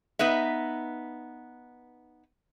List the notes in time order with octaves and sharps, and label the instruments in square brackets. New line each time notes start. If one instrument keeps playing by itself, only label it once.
[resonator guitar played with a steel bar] B3 D#4 B4 E5